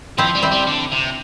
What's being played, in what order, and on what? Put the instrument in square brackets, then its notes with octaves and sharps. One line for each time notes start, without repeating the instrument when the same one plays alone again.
[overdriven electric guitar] F3 [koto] C4 E4
[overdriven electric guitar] G3
[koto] C4 E4
[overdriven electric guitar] G3
D3
C3